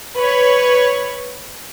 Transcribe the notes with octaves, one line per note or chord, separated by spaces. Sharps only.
B4 C#5